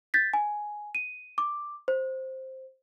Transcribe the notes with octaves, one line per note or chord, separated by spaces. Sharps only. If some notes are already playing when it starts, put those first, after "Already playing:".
G6 A6 B6
G#5
D#7
D6
C5